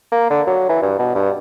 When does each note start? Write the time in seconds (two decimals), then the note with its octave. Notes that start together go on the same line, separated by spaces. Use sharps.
0.12 A#3
0.30 D3
0.47 F#3
0.69 E3
0.82 G2
0.99 B2
1.15 G2